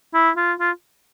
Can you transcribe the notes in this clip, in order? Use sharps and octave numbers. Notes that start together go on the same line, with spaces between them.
E4
F4
F4